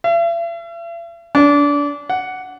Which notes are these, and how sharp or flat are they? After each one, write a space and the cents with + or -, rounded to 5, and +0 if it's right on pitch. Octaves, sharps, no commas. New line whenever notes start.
E5 +45
D4 -25
F#5 +0